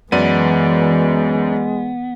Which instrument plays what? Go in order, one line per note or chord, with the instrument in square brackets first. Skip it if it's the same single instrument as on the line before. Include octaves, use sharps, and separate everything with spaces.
[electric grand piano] F#2 D5 D#7 [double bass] E3 [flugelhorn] G#3 [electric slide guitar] B3